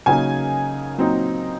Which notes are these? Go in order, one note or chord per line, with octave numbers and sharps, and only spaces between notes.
C#3 F#3 A#3 D#4 G#5
A#2 F#3 C4 D#4